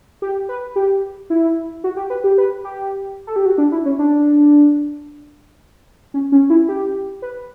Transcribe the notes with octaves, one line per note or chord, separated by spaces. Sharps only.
G4
B4
G4
E4
F#4
G4
B4
G4
B4
G4
A4
G4
F#4
D4
E4
C#4
D4
C#4
C#4
E4
G4
B4